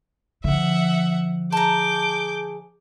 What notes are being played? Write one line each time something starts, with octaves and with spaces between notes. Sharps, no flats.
D3 F3 E5 F#5
G#4 A5 A#5 D6 G6